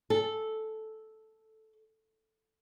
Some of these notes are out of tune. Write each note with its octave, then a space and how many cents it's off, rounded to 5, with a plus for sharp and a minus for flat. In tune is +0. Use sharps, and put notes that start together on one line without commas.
A4 -5